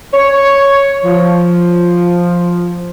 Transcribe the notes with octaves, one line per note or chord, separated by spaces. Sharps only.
C#5
F3